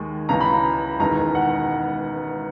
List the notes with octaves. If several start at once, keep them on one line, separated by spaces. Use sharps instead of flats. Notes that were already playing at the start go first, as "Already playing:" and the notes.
Already playing: D#2 D#3 G#3
C#2 C#3 E3 G#3 A#5
B5
A#5
E1 E2 D#3 G#3 A#5
F#5